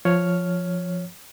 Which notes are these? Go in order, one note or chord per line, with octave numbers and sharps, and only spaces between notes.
F3 C#5 F6